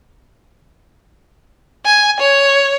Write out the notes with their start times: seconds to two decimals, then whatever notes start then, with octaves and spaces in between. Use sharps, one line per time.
1.85 G#5
2.20 C#5